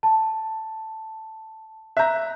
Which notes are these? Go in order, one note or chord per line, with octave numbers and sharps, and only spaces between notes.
A5
E5 A#5 F#6 G6